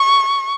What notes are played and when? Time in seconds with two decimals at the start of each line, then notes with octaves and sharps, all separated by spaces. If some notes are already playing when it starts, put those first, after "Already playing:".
Already playing: C#6